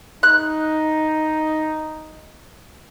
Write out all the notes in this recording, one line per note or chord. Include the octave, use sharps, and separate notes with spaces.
D#4 F#6